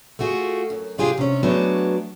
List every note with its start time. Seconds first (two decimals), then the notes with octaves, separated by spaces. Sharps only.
0.19 A3 F4 F#4 G#4
0.70 F#2
0.98 C3 D4 F4 G4 G#4
1.18 C3 C#4
1.43 F#3 A3 B3 D4 F#4 G#4